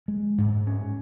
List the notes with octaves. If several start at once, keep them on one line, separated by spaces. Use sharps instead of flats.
G#3
G#2
C#4